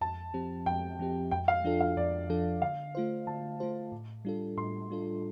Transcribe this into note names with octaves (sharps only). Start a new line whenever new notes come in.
F2 A5
F3 C4 G4
F2 G5
F3 C4 G4
F2 G5
F5
F3 D4 F4 A4
F5
F2 D5
F3 D4 F4 A4
D3 F5
A3 F4 C5
D3 A5
A3 F4 C5
A2
G3 D4 F4 A4
A2 C6
G3 D4 F4 A4